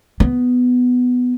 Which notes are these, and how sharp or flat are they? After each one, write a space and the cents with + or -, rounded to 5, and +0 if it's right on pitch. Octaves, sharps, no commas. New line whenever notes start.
B3 +10